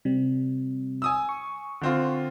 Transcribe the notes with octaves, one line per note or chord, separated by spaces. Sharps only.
C3 G3
G#5 D#6 E6
C#6
D3 C4 F4